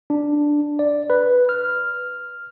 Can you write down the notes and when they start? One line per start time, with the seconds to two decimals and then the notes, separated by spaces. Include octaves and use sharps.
0.10 D4
0.79 D5
1.10 B4
1.49 F6